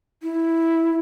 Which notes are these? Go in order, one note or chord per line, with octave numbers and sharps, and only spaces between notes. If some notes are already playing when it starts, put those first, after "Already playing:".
E4